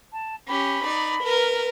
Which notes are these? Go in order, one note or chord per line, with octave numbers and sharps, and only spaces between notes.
A5
C#4 G4 B5
D#4 D5
A#4 B4